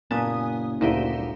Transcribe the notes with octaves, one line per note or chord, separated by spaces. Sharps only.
F#1 A#2 B3 G#5 A5 D#6
D2 A#2 D#4 E4 G4
G1